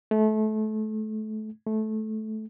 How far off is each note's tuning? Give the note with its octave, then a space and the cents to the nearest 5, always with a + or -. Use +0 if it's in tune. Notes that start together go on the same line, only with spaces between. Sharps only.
A3 -25
A3 -15